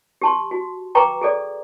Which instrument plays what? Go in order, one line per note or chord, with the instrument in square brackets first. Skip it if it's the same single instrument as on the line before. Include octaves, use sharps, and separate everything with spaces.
[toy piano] G4 A5 C6
F#4
B4 G5 A#5 C#6 D6
G#4 A4 D5